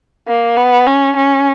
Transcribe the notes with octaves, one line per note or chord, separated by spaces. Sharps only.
A#3
B3
C#4
C#4